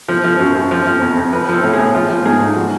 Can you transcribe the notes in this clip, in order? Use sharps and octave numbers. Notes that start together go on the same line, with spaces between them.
F3
F3
F#2
F#2
F3
F3
F2
F2
F3 B4
F3 A4
A2
G#4
A2
F3 F4
F3
G#2 G#4
G#2
F3 F#4